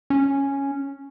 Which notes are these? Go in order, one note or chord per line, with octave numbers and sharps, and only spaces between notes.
C#4